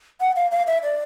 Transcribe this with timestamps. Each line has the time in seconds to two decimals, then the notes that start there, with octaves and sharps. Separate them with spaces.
0.21 F#5
0.36 F5
0.52 F5
0.67 E5
0.83 D5